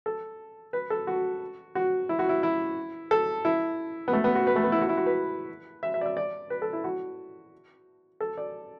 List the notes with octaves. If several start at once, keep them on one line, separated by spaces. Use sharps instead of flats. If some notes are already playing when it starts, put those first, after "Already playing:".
A4
B4
A4
F#4
F#4
E4
F#4
E4
E4
A4
E4
B3
A3
B3
F#4
B4
A3
B3
E4
F#4
E4
F#4
B4
E5
E5
D5
E5
D5
B4
A4
E4
F#4
A4
D5